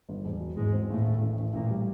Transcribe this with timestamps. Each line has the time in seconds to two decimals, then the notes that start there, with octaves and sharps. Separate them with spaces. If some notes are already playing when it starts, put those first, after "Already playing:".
0.09 G1
0.25 E1
0.41 F#3
0.57 E2 G#2 G#3
0.73 C4
0.89 D#2 A2 A3
1.06 D#2
1.21 A1
1.38 A1
1.53 A1 A#2 A#3
1.71 G3